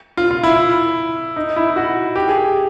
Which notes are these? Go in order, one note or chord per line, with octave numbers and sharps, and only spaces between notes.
F4
F4
E4
D#4
E4
F#4
G4
G#4